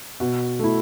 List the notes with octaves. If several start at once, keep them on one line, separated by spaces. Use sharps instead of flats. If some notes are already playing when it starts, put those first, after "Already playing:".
B2
A3 E4